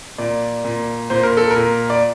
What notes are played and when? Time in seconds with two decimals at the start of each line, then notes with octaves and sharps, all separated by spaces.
0.18 A#2 D5
0.65 A#2
1.10 A#2 C5
1.23 A#4
1.37 A4
1.51 A#4
1.56 A#2
1.90 D5